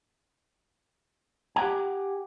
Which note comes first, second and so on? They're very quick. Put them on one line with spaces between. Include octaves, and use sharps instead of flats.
G#5 F#5 G4